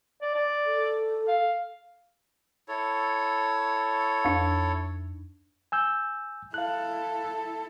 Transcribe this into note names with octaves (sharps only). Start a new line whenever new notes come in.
D5
D5
A4
F5
E4 A4 C#5
F2 D4
G#5 E6 G6
E4 A4 F5 F#6